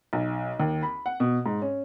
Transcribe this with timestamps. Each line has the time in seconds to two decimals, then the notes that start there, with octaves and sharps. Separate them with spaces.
0.13 B1
0.60 D#2
0.83 B5
1.06 F#5
1.20 B2
1.46 G#2
1.62 C#4